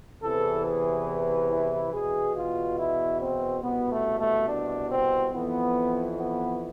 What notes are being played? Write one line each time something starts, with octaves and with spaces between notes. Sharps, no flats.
E2 C3 E3 A4
G#4
E4
E2 B2 G#4
F4
E4
C4
C2 B2 B3
A3
A3
D4
C4
F2 E3 B3
B3